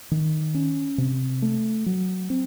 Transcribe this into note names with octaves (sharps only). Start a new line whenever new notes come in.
D#3
C#4
C3
A3
F#3
C4